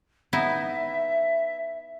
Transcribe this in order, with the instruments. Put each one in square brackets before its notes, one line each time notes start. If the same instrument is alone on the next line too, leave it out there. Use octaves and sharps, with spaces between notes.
[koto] B3 D#4 E4 [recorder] E5